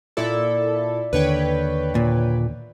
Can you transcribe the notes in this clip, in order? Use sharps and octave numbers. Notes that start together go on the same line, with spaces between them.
A#2 E4 A4 D5 E5
D#2 D3 B4 C#5 G5
A#2